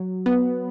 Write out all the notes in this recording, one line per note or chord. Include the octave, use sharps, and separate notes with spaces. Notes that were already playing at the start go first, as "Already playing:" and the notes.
Already playing: F#3
B3